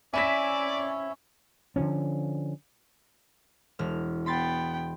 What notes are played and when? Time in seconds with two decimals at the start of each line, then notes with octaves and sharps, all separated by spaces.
0.14 C4 C#4 E4 D5 E5 G#5 B6
1.76 D3 D#3 F3 C#4
3.79 E1 F6
4.26 B3 G5 B5 C6 A6